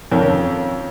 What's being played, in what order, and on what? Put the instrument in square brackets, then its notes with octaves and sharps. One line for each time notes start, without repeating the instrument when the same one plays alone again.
[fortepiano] F2 D#3 C#4 A#4 C#5